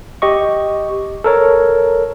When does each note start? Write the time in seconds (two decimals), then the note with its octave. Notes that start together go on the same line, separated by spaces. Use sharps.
0.22 G4 D#5 C#6
1.24 A4 A#4 C#5